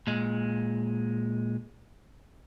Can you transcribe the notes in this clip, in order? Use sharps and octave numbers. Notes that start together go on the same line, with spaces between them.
A#2 G#3